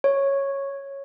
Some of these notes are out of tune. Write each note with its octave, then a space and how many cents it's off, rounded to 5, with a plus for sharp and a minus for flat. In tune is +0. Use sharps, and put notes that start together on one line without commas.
C#5 -5